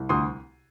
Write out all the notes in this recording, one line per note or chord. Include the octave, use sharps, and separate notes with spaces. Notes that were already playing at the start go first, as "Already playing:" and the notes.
Already playing: C2
D2 C6 D#6